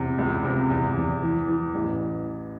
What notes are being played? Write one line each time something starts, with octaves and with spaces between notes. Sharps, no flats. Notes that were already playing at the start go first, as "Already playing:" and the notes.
Already playing: E2 C3
C#2
C3
E2
E2
E3
E3
A1